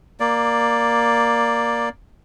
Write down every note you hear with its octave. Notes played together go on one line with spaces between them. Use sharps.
A#3 D5